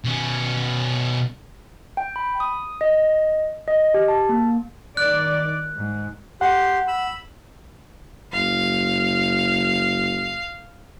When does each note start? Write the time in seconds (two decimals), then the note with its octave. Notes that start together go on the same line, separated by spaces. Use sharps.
0.05 B2 C#4
1.97 G5
2.16 B5
2.40 D#6
2.81 D#5
3.68 D#5
3.94 G4
4.08 A5
4.29 A#3
4.97 D#3 D5 F#6
5.76 G#2
6.41 G4 F#5 C6
6.88 B5 E6
8.32 F#1 F5